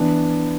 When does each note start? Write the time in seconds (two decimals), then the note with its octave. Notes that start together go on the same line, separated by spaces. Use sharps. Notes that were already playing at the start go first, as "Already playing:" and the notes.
Already playing: E3 B3 D4